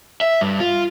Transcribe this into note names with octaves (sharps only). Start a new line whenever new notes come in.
E5
G2
F4